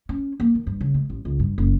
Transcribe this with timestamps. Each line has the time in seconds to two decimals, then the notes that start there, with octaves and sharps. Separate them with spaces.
0.09 C#4
0.40 A#3
0.55 D#3
0.67 G2
0.81 C#3
0.94 G#3
1.10 A1
1.25 C#2
1.40 G2
1.58 F#1